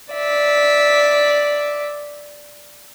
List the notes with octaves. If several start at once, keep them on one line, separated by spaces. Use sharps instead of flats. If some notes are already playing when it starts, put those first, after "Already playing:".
D5 E5